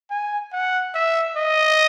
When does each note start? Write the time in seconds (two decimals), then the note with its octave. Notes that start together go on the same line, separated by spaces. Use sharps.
0.10 G#5
0.53 F#5
0.95 E5
1.37 D#5